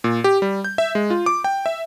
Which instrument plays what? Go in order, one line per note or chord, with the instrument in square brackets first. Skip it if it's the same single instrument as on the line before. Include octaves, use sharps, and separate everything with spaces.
[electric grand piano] A#2
G4
G3
G6
E5
G#3
F4
D6
G5
E5